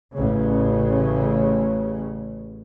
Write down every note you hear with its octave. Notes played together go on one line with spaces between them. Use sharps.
A1 C#3